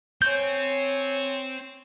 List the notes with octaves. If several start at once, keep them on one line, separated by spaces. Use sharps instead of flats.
C4 C#5 G#5 G6